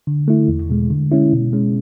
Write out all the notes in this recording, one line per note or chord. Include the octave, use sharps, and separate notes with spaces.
D3
A3 E4
E2
B2 G#3
D3
G#3 C#4 E4
B2
G#3 C#4